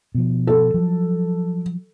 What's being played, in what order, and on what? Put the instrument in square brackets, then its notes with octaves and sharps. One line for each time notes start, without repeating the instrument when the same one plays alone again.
[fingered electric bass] B2 F3
[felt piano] A4
[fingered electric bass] F3 F#3